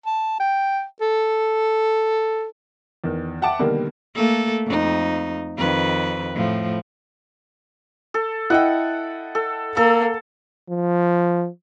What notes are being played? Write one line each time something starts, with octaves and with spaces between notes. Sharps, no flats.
A5
G5
A4
E2 D#3
E5 F#5 G5 A5 D6
B2 D3 D#3 G3 A#3
A3 A#3 A4
F2 D#4
F2 D#3 B4
A2 F3
A4
E4 D#5 F#5 G5
A4
A#3 A4 E6
F3